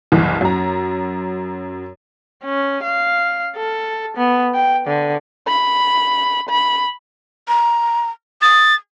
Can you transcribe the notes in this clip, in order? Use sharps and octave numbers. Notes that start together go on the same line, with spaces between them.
F#1 C2 E3
F#2 A#5
C#4
F5
A4
B3
G5
D3
B5
B5
A#5
D#6 A6